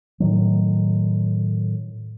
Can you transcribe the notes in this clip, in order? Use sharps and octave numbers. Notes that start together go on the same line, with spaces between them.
A2 D#3 F#3